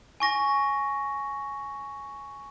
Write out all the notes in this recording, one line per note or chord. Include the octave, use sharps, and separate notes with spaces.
G#5 C#6 A#6